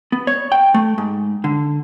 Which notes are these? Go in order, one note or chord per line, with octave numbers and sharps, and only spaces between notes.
B3
C#5
G5
A3
G#2
D3